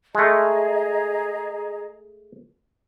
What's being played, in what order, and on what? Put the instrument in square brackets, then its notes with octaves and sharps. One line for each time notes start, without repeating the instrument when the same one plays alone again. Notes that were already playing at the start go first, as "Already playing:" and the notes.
[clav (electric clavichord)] G#3 A3 [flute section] G#4 D#5 A#5